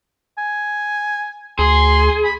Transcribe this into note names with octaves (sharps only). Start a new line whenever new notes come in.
G#5
D2 G#4 C6
B5